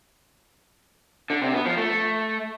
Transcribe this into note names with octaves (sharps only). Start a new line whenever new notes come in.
D3
C3
B3
F3
A3